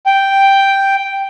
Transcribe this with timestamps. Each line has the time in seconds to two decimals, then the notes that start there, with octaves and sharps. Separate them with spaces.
0.06 G5